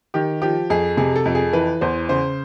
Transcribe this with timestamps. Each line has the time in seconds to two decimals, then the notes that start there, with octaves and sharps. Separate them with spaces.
0.14 D#3 G4
0.41 F3 G4
0.70 F2 G#4
0.97 C3 G#4
1.16 A4
1.25 F2
1.35 G#4
1.53 E3 B4
1.81 E2 C5
2.09 C#3 C5